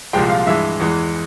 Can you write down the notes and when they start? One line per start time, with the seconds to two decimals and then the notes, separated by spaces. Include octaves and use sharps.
0.13 C2 A#2 F3 G#3 G4 G5
0.30 F4 F5
0.47 G2 E3 G#3 E5
0.80 E2 E3 G#3